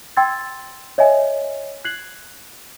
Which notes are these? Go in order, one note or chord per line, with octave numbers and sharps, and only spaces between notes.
G5 C6 E6 G#6 A6
C#5 D#5 E5 G#5
F#6 G#6 C7 F#7